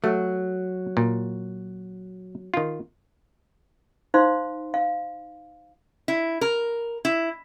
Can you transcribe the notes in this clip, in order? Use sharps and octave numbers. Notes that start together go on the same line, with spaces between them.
F#3 A3
A#2
D#3 F4
D#4 C5 F5 C6
F5
E4
A#4
E4